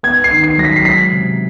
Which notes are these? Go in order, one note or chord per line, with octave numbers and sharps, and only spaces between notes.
B3 G#6
C7
D#3
C7
F#3 A#6
B6
C7
G#3 B6
C3